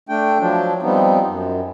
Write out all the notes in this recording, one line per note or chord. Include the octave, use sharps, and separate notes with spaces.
A3 D4 G5
F3 F#3 D4
F3 G3 B3 C4 D#4
F#2